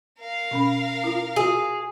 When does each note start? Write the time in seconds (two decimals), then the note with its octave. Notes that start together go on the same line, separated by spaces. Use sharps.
0.21 A#4 F5
0.51 B2 C#4 B5
1.04 E4 F4
1.36 F4 F#4 G#4